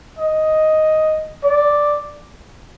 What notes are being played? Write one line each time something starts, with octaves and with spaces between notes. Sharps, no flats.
D#5
D5